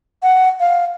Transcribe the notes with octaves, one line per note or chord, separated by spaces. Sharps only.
F#5
F5